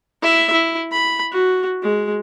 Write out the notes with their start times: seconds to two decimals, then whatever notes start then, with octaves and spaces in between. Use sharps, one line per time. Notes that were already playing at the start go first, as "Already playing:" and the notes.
0.22 E4 E5
0.52 E4
0.92 B5
1.32 F#4
1.82 G#3